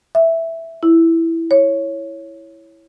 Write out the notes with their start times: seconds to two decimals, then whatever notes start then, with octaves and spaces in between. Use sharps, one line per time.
0.15 E5
0.83 E4
1.51 C#5